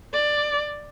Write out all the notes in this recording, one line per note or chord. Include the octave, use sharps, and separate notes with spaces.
D5